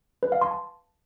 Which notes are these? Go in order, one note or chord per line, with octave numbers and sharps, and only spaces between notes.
B4
F5
C6
A5